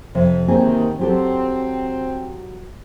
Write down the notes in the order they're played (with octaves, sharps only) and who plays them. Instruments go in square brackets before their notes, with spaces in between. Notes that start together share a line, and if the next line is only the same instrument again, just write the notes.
[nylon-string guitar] F2 C3
[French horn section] E2 C3 D#3 [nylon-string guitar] A#3 C4 G#4
[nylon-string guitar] F#3 G4 A4 [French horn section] C4